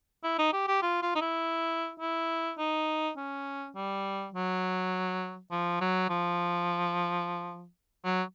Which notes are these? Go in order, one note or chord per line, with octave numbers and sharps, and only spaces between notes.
E4
D#4
G4
G4
F4
F4
D#4
E4
E4
D#4
C#4
G3
F#3
F3
F#3
F3
F#3